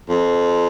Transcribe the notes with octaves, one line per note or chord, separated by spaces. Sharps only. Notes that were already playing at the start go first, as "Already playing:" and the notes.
F2